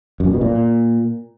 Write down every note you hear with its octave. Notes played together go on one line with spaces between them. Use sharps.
F#2
A#2
B2
A#2